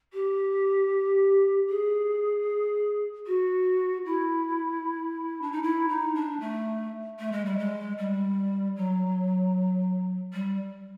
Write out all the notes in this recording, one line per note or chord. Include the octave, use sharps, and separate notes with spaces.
G4
G#4
F#4
E4
D4
D#4
E4
D#4
D4
A3
A3
G#3
G3
G#3
G3
F#3
G3